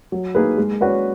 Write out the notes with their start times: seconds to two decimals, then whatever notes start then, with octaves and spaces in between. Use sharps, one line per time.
0.12 F#3
0.35 A#3 D#4 G#4 B4
0.58 G#3
0.81 C#4 F#4 B4 D5